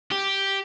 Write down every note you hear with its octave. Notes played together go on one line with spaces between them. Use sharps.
G4